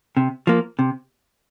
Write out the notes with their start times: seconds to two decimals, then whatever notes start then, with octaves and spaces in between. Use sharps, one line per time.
0.17 C3
0.47 F3 A#3
0.79 C3